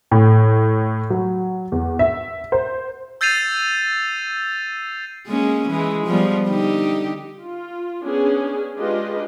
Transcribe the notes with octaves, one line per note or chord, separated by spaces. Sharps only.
A2
F#3
E2
E5
C5
E6 G6 A6 C7 D#7 F7
G#3 A#3 C#4
E3 G#3
F3 G3 B3
D3 D#4 G4
F4
B3 C#4 D4 G#4
G#3 D4 F4 G4 B4 D#5